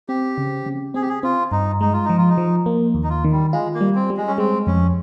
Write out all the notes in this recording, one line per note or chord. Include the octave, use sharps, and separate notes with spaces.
C4 G4
C#3
C#3
C4 G#4
G4
G#4
C4 F4
G2 D#4
G#3 D#4
F4
F3 D#4
F4
D#4
F3
A#3
D#2
D#4
F4
D#3
G3
G#3 F4
A#3
G3
C4
G3
G#3
C#4
G#3 C4
F2 C#4